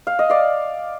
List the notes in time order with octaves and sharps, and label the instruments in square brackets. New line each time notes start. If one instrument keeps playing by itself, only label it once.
[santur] F5
D#5
D5 F5